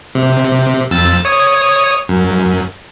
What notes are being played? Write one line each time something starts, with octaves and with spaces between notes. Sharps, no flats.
C3
F2 E6 A6
C#5 D#6
F#2